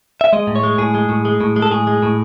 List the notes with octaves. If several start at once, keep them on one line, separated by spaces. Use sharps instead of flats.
E5
G#3 D#5
A2
C#5
G#3
A2 G#4
G#3
A2
G#3
A2
G#3
A4
A2 G#4
G#3
A2